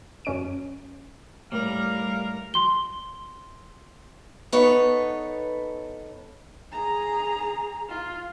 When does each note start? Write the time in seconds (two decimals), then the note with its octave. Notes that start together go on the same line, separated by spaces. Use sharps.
0.25 F#2 C#4 D7
1.52 A2 G3 A#4 F5
2.54 C6 G7
4.52 B3 D#4 A4 C#5
6.72 G#4 A#5
7.89 F4